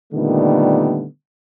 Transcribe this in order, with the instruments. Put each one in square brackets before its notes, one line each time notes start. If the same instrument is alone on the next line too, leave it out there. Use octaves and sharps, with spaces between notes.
[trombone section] A#2 D3 D#3 G3 A3 B3